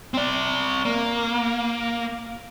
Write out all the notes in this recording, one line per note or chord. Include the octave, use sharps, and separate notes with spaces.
C4 D5
A#3